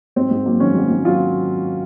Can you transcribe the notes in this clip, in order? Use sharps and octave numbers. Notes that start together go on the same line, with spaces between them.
G#2 C4
G#2
F#3 A#3
D#3 C#4
G#2
G#2
F#3 F4